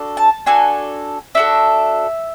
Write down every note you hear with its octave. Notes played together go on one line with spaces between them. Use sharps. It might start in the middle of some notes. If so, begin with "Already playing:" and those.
Already playing: D4 F#4 A4
A5
D4 F#4 A4 G#5
D4 F#4 A4 E5